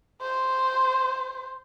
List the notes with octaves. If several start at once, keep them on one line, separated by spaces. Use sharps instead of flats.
C5